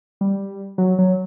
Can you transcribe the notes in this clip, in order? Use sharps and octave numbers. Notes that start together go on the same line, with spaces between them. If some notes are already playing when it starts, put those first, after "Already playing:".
G3
F#3
F#3